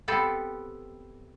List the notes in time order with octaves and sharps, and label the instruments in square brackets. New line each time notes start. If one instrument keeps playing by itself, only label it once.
[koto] B3 C4 G4 A4 B4